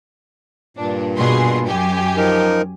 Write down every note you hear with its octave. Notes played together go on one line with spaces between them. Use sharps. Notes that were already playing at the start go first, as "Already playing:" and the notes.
G2 A#2 D4
B2 G#4 C6
F#2 G4 G#5
F3 D#4 A#4